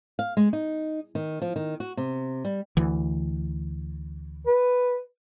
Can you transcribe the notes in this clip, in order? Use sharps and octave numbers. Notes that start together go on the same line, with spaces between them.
F5
G#3
D#4
D#3
F3
D#3
F#4
C3
G3
D2 E3
B4